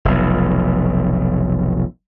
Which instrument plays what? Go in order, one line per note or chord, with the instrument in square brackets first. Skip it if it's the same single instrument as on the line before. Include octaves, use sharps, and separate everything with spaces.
[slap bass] F1 B1